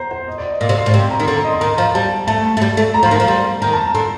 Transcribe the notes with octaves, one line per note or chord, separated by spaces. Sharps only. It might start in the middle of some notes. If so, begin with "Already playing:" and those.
Already playing: C5 A#5
C5
D#5
D5
D#5
A#2 F5
C3
F5
A2
C3 G5
A#5
D#3
D3 C6
A#5
D#5
C6
D#3 A#5
F3 A#5
G3 A5
A3 A5
A3
G3
A3
A#5
F3
C6
D#3
F3 A#5
G3
D#3 A#5
A5
A#5
D3 C6